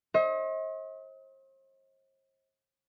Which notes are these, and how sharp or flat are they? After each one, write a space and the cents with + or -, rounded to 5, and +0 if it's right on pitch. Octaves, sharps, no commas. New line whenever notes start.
C5 +45 D#5 +40